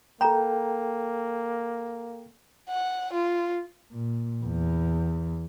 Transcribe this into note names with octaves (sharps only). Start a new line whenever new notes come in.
A#3 A4 G5 A#5 B5
F#5
F4
A#2
E2